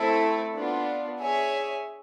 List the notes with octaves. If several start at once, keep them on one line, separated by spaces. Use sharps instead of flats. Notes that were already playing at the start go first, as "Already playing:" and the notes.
Already playing: A3 C4 E4 A4
B3 D4 F4
G#4 C#5 E5 G#5